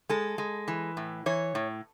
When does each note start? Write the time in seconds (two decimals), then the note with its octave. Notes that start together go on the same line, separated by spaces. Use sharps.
0.09 G#3 A4
0.38 G#3
0.68 E3
0.97 A2
1.26 E3 C#5
1.55 A2